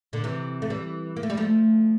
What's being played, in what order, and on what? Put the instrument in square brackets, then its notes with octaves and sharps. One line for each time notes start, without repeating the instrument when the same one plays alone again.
[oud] A#2 D3
C3 E3
A3
E3 G3
A#3
A3
G3
F3 A3